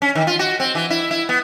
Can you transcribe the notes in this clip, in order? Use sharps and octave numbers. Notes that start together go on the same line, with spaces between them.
C#4
D#3
F4
F#4
C4
E3
E4
E4
B3